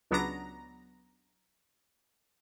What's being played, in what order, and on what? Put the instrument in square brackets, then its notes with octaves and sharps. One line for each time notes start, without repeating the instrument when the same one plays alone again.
[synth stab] C#2 F#3 B3 D4 A#5 A#6